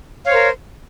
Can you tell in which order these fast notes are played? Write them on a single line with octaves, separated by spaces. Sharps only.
F5 C#5 C5 A#4